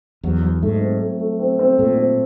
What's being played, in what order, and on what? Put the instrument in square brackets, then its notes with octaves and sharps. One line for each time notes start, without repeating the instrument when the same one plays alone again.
[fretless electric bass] E2 [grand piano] F#3
[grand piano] F#3
[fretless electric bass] G#2 [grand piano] A3
[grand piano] C4
A3
A3
C4
C4
[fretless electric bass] A#2 [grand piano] A3
[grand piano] C4